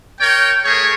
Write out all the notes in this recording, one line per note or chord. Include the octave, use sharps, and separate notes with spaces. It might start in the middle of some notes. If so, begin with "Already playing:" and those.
A#4 C#5 G5
A3 G#4 A#4 C#5